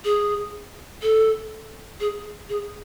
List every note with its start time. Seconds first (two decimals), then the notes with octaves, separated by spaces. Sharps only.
0.05 G#4
1.02 A4
2.00 G#4
2.49 G#4